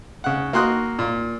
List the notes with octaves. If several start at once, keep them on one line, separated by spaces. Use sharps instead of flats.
C#3 F#5
A#3 F#4 C6 D#6 F#6
A#2